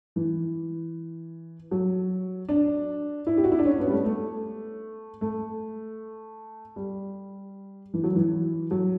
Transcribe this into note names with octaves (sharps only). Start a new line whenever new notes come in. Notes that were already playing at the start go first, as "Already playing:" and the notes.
E3
F#3
D4
E4
G4
F#4
E4
D4
C#4
B3
G3
A3
A3
A3
G3
E3
F#3
E3
F#3